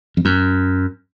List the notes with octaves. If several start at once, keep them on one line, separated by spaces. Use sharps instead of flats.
F2
F#2